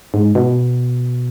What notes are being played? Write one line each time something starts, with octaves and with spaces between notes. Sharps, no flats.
G#2
B2